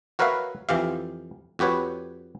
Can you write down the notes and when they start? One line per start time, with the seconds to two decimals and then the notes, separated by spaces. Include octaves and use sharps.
0.19 F#4 A#4 B4 C#5 E5 F5
0.69 F2 E3 G4 F5
1.59 F2 F#4 G4 B4 C#5